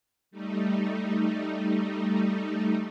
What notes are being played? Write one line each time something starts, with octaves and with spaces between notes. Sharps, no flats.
G3 A3 D#4